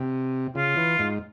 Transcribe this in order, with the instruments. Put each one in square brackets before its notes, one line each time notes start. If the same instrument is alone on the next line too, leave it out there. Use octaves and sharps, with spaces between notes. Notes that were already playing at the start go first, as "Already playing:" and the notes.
Already playing: [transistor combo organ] C3
[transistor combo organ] C#3 [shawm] F4
[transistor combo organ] E3
G#2